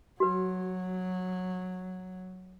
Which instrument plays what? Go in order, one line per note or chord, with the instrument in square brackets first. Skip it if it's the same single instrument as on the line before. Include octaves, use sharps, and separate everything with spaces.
[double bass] F#3 [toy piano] F#4 B4